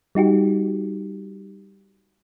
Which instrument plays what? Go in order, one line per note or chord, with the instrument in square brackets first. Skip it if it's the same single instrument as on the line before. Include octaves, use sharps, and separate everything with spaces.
[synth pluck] G3 D#4 F#4 G4